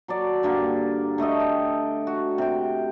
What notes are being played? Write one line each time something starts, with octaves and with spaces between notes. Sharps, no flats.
F#3 A4 D5
G2 D3 A#3
D3 A3 A4 D#5
G5
F#4
C3 G5